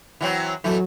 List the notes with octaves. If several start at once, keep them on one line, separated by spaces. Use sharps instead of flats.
E3 F#3 C4
E3 F#3 A3